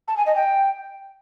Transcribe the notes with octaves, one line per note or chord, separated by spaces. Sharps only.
A5
G#5
D#5
G5